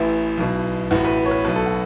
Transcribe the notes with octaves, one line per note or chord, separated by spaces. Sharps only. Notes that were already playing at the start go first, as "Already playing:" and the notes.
Already playing: A1 A2 E3 E4
B1 B2
A1 A2 E3 F#4
B4
C#5
B4
B1 B2 B4
A4
F#4